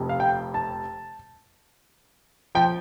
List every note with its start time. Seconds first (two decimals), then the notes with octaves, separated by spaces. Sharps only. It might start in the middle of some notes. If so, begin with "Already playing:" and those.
Already playing: F1 F2 C3
0.09 F5
0.20 G5
0.54 A5
2.55 F3 G5